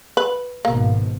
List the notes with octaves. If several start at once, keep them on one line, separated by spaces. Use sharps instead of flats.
B4
G#1 B2 A#3